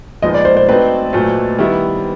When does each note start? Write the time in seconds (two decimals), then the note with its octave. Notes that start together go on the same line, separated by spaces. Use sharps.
0.22 A#2 F3 G#3 B3 D#4 D#5
0.34 D5
0.45 C5
0.57 C5
0.68 F#3 A3 C4 D#4 B4
1.13 A#2 F#3 A3
1.58 D#3 G3 B3 E4